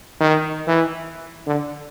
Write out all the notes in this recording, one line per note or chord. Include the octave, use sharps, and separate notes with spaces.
D#3
E3
D3